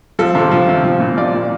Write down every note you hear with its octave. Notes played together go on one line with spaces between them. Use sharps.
F3 A4
C3
F3
C3
F3
A#2
F3 D5
A#2